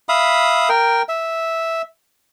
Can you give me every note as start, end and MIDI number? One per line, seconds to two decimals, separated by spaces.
0.09 0.69 76
0.09 0.69 77
0.09 0.69 83
0.09 0.69 87
0.69 1.02 70
0.69 1.02 79
1.09 1.82 76